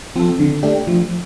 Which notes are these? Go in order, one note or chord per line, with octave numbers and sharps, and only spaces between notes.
F3 C4 F4 A4
D3
A3 D4 G4
F3